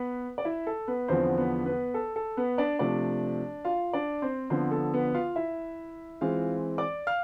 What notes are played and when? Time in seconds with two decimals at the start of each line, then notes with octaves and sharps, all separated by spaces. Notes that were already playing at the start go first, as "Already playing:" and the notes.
Already playing: B3 B4
0.38 D5
0.45 E4 E5
0.67 A4
0.88 B3 B4
1.08 E2 D3 F3 B3 C4 C5
1.38 B3 B4
1.66 B3 B4
1.94 A4
2.16 A4
2.37 B3 B4
2.58 D4 D5
2.79 C3 F3 A3 D4 D5
3.65 F4 F5
3.93 D4 D5
4.22 C4 C5
4.50 D3 F3 B3 C4 C5
4.71 A4
4.93 B3 B4
5.14 F4 F5
5.36 E4 E5
6.21 E3 G#3 C4 F4 F5
6.78 D5 D6
7.07 F5 F6